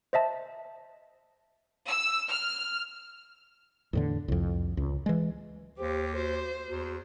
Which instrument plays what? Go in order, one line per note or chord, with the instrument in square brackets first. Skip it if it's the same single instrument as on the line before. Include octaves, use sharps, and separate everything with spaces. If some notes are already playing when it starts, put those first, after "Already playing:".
[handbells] C5 D#5 E5 A5
[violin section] E6
F6
[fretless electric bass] E2 A2 D3
C2 F2
C#2
E3 G#3
[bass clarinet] D#2 [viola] G4 [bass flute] C5
[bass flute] F#4 [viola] C5
[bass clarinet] E2 [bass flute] F#4